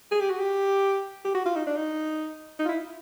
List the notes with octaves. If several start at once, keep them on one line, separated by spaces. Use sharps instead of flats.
G#4
G4
F#4
G4
G4
F#4
F4
D#4
D4
D#4
D#4
F4
E4